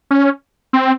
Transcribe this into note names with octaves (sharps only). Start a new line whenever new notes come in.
C#4
C4